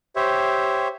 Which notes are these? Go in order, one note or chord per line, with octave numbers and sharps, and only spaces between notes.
G4 C5 C#5 E5